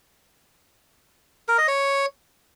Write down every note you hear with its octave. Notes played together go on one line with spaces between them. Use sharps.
A#4
D#5
C#5